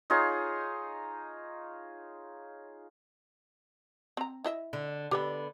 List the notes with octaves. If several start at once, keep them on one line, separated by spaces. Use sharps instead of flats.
D#4 F4 G#4 C#5
C4 A#5
E4 D#5 E5
D3
D3 B3 G4 B4